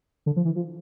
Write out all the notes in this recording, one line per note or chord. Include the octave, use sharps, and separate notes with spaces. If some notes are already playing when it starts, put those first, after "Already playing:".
D3
F3
E3
F3